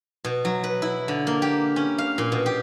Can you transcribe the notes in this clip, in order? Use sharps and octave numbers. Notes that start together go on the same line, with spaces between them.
B2
F#3
B4
E4
D3
A#3
G4
C#4
F5
A#2
B2
G4